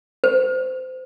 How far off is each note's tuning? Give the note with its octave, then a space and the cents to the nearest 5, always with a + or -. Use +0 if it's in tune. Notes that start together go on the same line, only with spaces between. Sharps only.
C5 -25